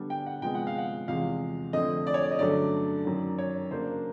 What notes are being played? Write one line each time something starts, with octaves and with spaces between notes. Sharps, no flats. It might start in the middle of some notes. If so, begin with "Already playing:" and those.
Already playing: D3 G3 B3 D4
G5
F#5
C3 F3 G#3 B3 G5
F#5
F5
F#5
E2 C3 F3 G#3 F5
F2 D3 F3 A3 C4 D#5
D5
C#5
D5
D#5
G2 D3 F#3 A3 C#4 D5
F#2 D#3 F#3
C#5
C#3 F#3 A#3 D4 C5